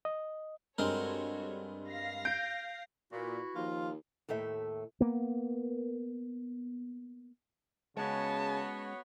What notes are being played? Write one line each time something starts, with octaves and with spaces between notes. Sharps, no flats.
D#5
G2 G#3 C4 F#4 A4 A#4 C#5
F5 A#6 C7
G6 D7
A#2 E3 E4 F#4
D#2 F3 F4
D#2 A2 A3 E5
A#3 B3
C#3 G#3 B3 C#4 F#4 C#5 A5